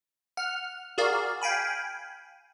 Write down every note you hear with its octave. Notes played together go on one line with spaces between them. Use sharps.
F#5 F6
F#4 G#4 A#4 D5 F5
F5 G5 G#5 B5